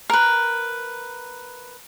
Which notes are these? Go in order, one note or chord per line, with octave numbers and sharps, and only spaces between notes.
A#4 B4